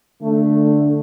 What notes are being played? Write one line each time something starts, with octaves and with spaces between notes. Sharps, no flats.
D3 A3